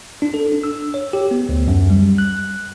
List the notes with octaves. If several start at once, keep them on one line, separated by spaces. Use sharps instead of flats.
D4
A4
D4
E6
C#5
G4
B3
D2
F#2
G3
F#6